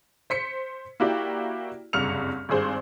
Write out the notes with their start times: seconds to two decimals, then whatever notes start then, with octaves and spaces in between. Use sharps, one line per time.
0.30 C5 B6 C#7
1.00 A#3 E4 F#4 G4 D5 G5
1.93 F#1 C2 G2 F6 C#7 F7
2.49 G#1 G2 G#4 C5